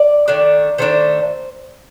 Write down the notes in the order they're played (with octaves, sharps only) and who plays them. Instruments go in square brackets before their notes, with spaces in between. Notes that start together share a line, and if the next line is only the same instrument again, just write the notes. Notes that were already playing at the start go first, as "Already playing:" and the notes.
Already playing: [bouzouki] D5
D#3 A3 D4
D#3 A3 D4 C5